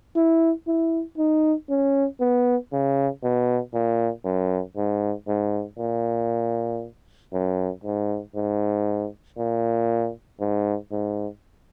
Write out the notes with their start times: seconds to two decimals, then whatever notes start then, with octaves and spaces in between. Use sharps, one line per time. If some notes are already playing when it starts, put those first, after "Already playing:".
0.16 E4
0.67 E4
1.18 D#4
1.70 C#4
2.20 B3
2.72 C#3
3.24 B2
3.74 A#2
4.25 F#2
4.77 G#2
5.28 G#2
5.79 A#2
7.33 F#2
7.84 G#2
8.35 G#2
9.38 A#2
10.40 G#2
10.92 G#2